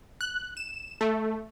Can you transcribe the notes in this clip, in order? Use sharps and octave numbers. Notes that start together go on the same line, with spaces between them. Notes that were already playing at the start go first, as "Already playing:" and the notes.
F#6
E7
A3